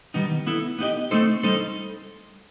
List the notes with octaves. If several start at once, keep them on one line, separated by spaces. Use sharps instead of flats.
D#3 G3 B3 D#4
B3 E4 A4
B3 D#4 G4 D#5
A3 C4 D#4 A4 C5
G3 D#4 A4 C5